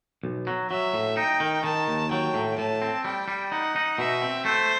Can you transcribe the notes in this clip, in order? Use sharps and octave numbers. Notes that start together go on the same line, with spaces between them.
B1
F#3
F#3 E5
A2
D#4 G5
D#3
D#3 A5
D#2
F#3 G5
A2
A2 A5
C4
G3 G5
G3
D#4 F#5
D#4
B2 E5
C4
A3 C5